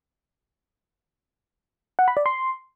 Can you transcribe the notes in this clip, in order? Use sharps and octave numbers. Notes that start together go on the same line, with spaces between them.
F#5
B5
D5
C6